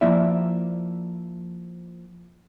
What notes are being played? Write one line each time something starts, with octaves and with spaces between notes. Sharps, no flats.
F3 A#3 E4 D5 E5